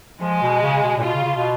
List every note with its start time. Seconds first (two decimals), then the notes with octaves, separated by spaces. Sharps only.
0.21 F3 G#3
0.42 B2
0.63 C#3
0.83 B2
0.97 A#2
1.04 B2 F4
1.15 C#3
1.25 C#3
1.35 B2